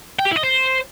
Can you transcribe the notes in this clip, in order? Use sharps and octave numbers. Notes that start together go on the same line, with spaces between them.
G5
G4
E4
D#5
C5